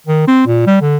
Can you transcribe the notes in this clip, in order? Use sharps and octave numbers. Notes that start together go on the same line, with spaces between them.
D#3
C4
A#2
G3
D3